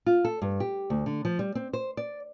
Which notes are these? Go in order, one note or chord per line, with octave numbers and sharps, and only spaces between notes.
F4
A4
G2
G4
D2
D3
F3
G3
C4
C5
D5